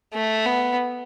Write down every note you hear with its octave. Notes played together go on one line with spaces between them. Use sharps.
A3
B3